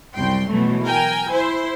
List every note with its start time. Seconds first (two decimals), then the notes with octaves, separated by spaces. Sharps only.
0.15 C2 F#2 G5 C6
0.50 B2 E3 F#3 A3
0.85 A#4 G5 G#5
1.30 E4 C5